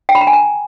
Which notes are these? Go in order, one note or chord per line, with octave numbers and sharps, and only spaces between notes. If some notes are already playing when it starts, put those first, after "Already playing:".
G5
B5
A#5
G#5
A#5